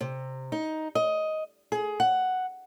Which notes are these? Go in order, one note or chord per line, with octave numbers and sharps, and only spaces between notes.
C3
D#4
D#5
G#4
F#5